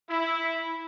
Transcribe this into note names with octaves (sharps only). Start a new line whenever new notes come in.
E4